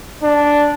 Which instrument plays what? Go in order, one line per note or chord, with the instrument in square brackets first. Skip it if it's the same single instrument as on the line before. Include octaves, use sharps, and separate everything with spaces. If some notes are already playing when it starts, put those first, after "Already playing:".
[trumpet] D4